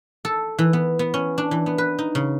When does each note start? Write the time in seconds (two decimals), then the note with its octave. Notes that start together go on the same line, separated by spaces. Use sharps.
0.25 A4
0.59 E3
0.73 B3
0.99 B3
1.14 C#4
1.38 D4
1.51 E3
1.66 B3
1.78 B4
1.99 D#4
2.15 C#3